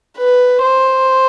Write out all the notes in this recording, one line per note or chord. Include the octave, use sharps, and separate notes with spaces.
B4
C5